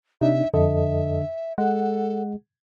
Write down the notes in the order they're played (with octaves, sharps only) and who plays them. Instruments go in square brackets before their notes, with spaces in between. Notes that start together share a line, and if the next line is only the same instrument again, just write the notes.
[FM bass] C3 [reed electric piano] D4 D#4 [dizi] E5
[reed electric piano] F2 A4 D#5 [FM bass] D3 [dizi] E5
[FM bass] G#3 [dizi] A4 [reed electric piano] F#5